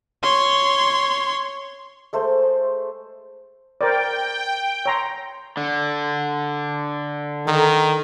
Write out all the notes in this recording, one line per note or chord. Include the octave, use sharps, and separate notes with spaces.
C#5 C6
G#3 A3 C5
A#4 C5 D5 G5
C#5 A#5 C6
D3
D#3 A4